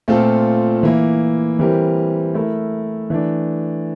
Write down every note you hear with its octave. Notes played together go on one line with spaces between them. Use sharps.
A#2 A3 C4 F4 A4
E3 A#3 E4
E3 G3 C4 G4 A#4
A3 E4 A#4
E3 A3 D4